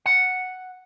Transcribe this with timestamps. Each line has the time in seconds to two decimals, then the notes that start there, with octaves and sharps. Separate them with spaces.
0.06 F#5